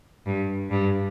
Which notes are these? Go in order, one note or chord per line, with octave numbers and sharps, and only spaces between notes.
G2
G2